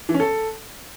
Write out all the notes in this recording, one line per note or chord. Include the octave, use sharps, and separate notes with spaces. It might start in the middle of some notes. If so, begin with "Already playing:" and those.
E3
C#4
A4